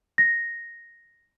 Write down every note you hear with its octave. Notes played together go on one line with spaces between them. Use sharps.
A#6